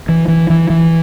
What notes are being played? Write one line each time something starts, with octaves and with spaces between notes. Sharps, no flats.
E3
E3
E3
E3